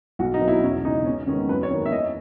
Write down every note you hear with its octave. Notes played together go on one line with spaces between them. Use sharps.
B1 F#4
D#4
B2 F#3 B3
E4
E1 C#4
E2 C#3 D#4
E2 C#4
D#3 G#3 B3 C#4
F#2 B4
C#5
D#3 A#3
E5
E2 D#5